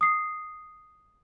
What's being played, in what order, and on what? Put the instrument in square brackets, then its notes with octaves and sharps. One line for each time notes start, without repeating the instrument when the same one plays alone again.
[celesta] D#6 C7